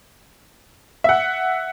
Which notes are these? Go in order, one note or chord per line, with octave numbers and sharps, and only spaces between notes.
E5 F#5